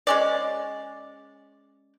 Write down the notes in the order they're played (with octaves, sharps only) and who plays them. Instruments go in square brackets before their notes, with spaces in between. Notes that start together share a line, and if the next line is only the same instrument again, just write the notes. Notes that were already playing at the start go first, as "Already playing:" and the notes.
[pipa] G#3 C#4 D5